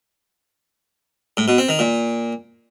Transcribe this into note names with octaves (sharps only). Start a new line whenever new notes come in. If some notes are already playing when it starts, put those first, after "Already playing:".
A2
B2
C4
D#3
A#2